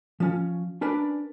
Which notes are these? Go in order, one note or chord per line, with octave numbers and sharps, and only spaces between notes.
F3 C#4
C#4 D4 A#4 B4 D5